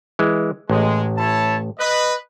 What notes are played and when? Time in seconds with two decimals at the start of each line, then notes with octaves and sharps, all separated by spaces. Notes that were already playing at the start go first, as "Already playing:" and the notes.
0.19 E3 G#3
0.70 A1 G#3
1.17 E4 C#5 A5
1.79 B4 D#5